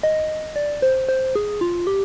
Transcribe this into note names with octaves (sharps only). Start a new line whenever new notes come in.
D#5
D5
C5
C5
G#4
F4
G4